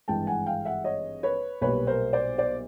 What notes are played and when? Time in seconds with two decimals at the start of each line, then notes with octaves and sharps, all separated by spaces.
0.08 G#1 G2 E3 G#3 G5 A5
0.27 F#5 G#5
0.46 F5 G5
0.65 E5 F#5
0.84 C#5 D#5
1.23 B4 C#5
1.61 B1 A#2 G3 B4 C#5
1.87 A#4 C5
2.13 C5 D5
2.38 C5 D5